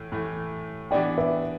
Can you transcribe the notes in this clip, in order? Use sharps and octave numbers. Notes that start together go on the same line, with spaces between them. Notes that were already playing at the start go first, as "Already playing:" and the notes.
Already playing: A2 E3 A3
A2 E3 A3
E3 B3 D4 G4 D5 G5
B4 E5